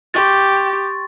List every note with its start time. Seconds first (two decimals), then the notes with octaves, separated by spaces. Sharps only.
0.14 G4 C6 C#6 A6